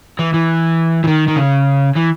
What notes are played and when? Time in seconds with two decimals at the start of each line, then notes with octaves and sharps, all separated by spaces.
0.19 E3
0.34 E3
1.04 E3
1.08 D#3
1.28 D#3
1.36 C#3
1.96 E3